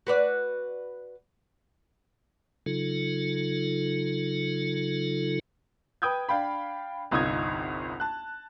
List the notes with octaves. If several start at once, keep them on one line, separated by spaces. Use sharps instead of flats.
F#4 B4 D5
C#3 F#3 D#4 F4 A4
B4 G5 D#6 G6 G#6
D4 F5 G5 B5
G1 C2 D#4 F4 D#6 G#6
A5 F#6